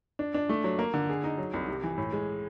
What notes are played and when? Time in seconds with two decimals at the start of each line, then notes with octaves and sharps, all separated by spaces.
0.19 D4
0.34 D4
0.49 A3
0.64 F#3
0.79 A#3
0.94 D3
1.09 G#4
1.24 D#4
1.38 F#3
1.54 C2
1.68 C3
1.83 E3
1.98 A2
2.12 G#3